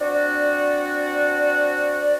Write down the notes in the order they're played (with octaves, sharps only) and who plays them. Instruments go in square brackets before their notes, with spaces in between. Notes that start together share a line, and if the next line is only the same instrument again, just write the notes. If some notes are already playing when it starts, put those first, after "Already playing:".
[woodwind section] C4 D4 F#4 [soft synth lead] D5